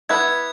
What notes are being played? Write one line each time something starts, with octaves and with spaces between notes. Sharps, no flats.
B3 E4 B4 G#6